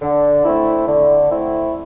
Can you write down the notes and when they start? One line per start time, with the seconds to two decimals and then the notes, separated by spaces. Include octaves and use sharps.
0.02 D3
0.44 A3 C4 E4
0.87 D3
1.30 A3 C4 E4